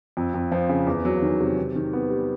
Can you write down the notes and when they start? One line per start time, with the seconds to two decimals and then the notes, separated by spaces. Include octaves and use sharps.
0.17 F2
0.34 F2
0.52 F3
0.69 C#3
0.87 E2
1.05 F#3
1.22 D#3
1.40 C3
1.58 D#3
1.75 D#3
1.93 B3
2.11 G3